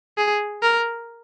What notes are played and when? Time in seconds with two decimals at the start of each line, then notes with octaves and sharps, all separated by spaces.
0.17 G#4
0.63 A#4